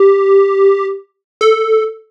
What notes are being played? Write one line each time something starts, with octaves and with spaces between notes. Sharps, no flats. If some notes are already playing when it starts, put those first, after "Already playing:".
Already playing: G4
A4